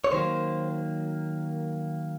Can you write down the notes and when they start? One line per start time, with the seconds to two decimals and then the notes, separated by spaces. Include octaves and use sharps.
0.04 C#5
0.11 D#3 F#3 A#3 C5